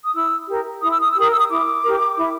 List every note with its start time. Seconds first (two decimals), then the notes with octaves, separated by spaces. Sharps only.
0.04 D#6
0.13 E4 E6
0.48 G4 A#4
0.82 E4 D#6
0.91 E6
1.01 D#6
1.10 E6
1.16 G4 A#4 D#6
1.29 E6
1.40 D#6
1.49 E4 D6
1.83 G4 A#4
2.17 E4